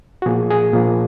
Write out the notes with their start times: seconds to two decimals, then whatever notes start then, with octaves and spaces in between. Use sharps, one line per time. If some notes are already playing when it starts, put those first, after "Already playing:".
0.22 F#4
0.26 A#2 F3 A#3 G#4
0.50 G#4
0.73 A#2 F3 A#3